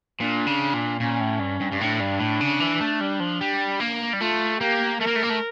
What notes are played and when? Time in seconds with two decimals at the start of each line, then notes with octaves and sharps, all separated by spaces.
0.20 A#2 D4
0.47 C#3
0.74 A#2
1.00 A#2 C#4
1.20 A2
1.40 G2
1.60 G2
1.72 G2
1.80 A2 D4
2.00 G2
2.20 A2
2.41 C#3
2.60 E3
2.81 A3
3.01 G3
3.20 F3
3.41 G3
3.80 A#3
4.13 G3
4.20 A3 F4
4.60 A#3 G4
5.01 A3 A#4
5.07 A#3
5.16 A3
5.23 A#3
5.30 A3